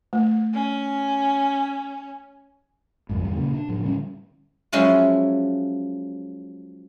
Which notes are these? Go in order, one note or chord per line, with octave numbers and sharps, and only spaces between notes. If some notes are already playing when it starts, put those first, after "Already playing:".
A3
C#4
C2 F2 G#2
E2 D#3 G3
A#2 C#3 A#3
D4
A2 F3
D3 G3 A3 C#4
F3 F#3 G#3 C#4 E4 F4